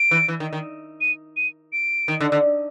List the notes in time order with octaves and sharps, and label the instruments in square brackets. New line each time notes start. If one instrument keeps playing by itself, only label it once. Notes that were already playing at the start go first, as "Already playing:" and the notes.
Already playing: [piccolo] D7
[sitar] E3
E3
D#3
D#3
[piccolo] D#7
D#7
D7
[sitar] D#3
D3
D3